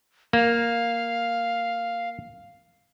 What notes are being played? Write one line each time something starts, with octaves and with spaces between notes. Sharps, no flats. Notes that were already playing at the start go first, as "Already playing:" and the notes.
A#3 F5